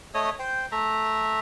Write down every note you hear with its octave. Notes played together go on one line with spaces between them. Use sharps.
A3 C#5 D#5 D#6
C5 G5
A3 E5 A#5